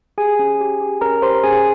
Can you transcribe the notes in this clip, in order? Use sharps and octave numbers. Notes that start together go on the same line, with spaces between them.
G4 G#4 G#5
C#4
G4
G4
C#4 A#4 A#5
G4 C5 C6
C#4 G#4 G#5